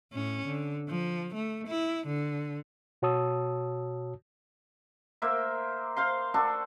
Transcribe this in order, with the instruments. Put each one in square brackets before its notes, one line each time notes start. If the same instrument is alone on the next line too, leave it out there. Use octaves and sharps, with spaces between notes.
[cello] A2 C#4
D3
F3
A3
E4
D3
[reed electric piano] B2 F#4 C#5 A5 D#6 E6
[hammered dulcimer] A#3 C5 E5
C5 F5 C6
D4 F#4 A4